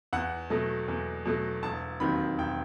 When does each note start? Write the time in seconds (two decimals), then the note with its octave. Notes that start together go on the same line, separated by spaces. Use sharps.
0.13 E2 F#5
0.50 B2 F#3 A3
0.88 E2
1.25 B2 F#3 A3
1.63 E1 A5
2.00 D#2 D#3 F#3 C4 B5
2.38 E1 G5